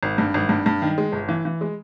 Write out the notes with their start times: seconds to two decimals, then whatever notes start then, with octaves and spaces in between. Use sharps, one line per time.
0.03 G#1
0.18 G2
0.34 G#1
0.49 G2
0.66 G2
0.82 D#3
0.98 G#3
1.12 G1
1.29 E3
1.45 E3
1.61 G#3